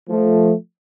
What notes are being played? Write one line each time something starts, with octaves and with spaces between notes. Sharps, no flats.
F3 A3